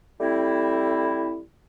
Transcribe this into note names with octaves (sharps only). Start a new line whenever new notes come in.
G3 A3 C4 E4